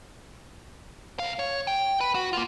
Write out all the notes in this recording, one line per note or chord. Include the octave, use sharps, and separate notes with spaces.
C2 F5
C#5
G5
B4
F#4
A#3 F4